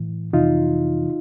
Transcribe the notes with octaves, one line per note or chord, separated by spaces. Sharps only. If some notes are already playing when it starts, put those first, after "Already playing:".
Already playing: A2 E3
F2 C3 E3 D#4 F4